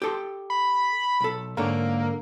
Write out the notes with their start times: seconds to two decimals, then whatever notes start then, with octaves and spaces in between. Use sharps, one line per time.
0.02 G4 A4 C6
0.50 B5
1.20 B1 A4
1.57 G#2 D3 A#3 C#5